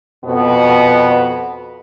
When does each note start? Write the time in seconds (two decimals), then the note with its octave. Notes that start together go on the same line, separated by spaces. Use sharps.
0.25 F2 B2 B3